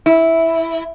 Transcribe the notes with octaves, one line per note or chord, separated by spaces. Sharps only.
E4